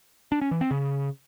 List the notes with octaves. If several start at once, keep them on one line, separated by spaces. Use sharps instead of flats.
D4
C#4
E3
C4
C#3